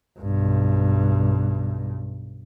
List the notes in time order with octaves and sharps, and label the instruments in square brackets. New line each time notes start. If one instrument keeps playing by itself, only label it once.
[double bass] B1 G2